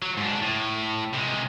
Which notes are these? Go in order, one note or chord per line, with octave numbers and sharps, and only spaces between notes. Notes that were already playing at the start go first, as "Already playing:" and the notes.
F#3
G#2 D4
A2
C3 G#3